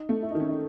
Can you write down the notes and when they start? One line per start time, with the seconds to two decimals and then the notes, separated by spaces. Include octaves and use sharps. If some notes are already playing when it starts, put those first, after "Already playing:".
Already playing: D#4
0.09 A3
0.22 E4
0.31 D#4
0.35 D#3 C#4
0.49 D#4